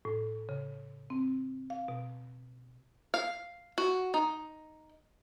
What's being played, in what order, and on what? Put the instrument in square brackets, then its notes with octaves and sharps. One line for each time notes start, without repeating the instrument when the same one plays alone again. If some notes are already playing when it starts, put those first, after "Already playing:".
[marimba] A2
C#3
C4
F5
B2
[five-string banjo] F5
F#4
D#4